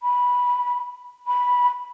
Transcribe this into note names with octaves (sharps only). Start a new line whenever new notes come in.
B5
B5